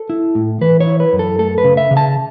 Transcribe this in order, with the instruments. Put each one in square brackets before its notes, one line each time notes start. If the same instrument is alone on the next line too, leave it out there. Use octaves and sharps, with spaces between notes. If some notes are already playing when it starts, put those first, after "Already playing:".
Already playing: [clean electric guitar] A4
E4
A2
E3 B4
C#5
E4
B4
F#2
A4
A3 A4
B4
C#3
E5
C#3
A5